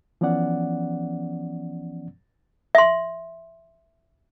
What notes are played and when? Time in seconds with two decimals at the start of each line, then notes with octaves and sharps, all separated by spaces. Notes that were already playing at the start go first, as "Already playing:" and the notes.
0.21 E3 F3 B3 C#4 D5 F#5
2.75 E5 C6